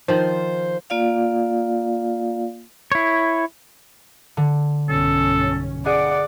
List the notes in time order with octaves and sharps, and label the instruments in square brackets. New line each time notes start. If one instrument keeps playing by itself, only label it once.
[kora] D#3 F3 [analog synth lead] C5
[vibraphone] A#3 F4 D5 F5
[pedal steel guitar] E4 C#5
[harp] D3
[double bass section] B1 G2 C#4 [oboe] A4
[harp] G#4 D7 [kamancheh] D5 [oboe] F#5